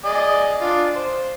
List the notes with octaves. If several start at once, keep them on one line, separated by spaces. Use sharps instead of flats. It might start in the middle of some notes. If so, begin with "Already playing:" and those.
G#4 D5 D#5
D4 F4
C5